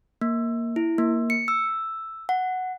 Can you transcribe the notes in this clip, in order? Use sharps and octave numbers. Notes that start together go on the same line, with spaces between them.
A#3
E4
A#3
C#7
E6
F#5